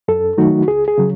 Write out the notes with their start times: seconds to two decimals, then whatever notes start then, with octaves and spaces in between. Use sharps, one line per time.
0.08 F#2 A4
0.38 D#3 F#3 A3 D#4 F#4
0.68 C#2 G#4
0.88 G#4
0.98 C#3 F#3